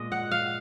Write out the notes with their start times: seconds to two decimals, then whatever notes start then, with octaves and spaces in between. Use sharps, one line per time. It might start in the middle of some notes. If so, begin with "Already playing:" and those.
Already playing: A#2 G#3 D#5
0.12 F#5
0.31 F5